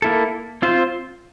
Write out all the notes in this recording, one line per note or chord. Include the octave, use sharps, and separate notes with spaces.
A#3 E4 A4
C4 F4 C5